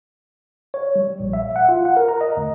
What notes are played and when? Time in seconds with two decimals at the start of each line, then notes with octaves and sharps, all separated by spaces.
0.74 C#5
0.96 G3
1.20 A#1
1.33 E5
1.56 F#5
1.69 F4
1.85 F#5
1.97 A#4
2.08 A#5
2.21 D#5
2.37 D2